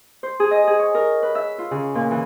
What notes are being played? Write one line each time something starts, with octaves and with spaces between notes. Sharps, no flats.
C5
G#4
D#5
G#4
C#5
A#4
B4
E5
F4
C#3
A#2
E3